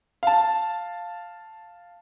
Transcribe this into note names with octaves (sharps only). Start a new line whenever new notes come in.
F5 A5